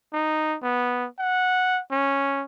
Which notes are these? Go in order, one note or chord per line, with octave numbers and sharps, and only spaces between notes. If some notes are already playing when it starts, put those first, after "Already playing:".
D#4
B3
F#5
C#4